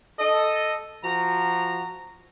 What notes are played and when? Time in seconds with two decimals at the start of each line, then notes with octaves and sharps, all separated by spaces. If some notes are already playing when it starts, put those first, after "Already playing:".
0.20 A4 D#5
1.04 F3 F#4 A#5